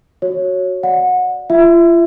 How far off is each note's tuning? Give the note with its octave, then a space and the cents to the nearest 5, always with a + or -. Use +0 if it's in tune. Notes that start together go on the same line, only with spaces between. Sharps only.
F#4 +0 C#5 -5
D5 +0 F#5 -25
F4 -40 E5 +0